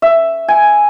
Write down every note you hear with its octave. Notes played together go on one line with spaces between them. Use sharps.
E5
G#5